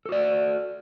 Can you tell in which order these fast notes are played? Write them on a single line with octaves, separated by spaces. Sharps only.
A4 F#4 D5